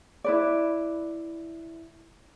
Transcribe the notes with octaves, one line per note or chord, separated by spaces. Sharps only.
E4 B4 D5